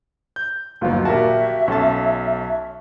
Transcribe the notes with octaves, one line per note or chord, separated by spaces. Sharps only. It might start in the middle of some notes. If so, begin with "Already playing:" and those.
G6
G1 D#2 F#3 F4 B4
A#1 A#3 F#4 G4 E5 A5
B1 C#4 A4 A5